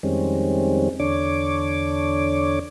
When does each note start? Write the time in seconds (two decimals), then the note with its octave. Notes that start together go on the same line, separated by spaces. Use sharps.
0.03 F2 D#3 G3 G#3 C4 C#4
1.00 E2 D3 D4 C#5 D6